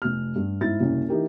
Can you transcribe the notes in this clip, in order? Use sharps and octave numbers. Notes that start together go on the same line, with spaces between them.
F1 F6
G2
G#2 E4 A6
F#1 C2 C#4
E3 D#4 G4 A#4